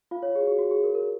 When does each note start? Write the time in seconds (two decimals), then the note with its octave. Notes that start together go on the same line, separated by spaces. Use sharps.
0.11 F4 F5
0.23 C#5
0.35 G#4
0.41 F#4
0.47 G#4
0.59 F#4
0.71 G#4
0.84 A#4
0.95 A#4